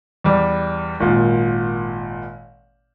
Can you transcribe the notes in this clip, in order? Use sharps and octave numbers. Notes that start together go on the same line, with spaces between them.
E2 G3
G#1 A#2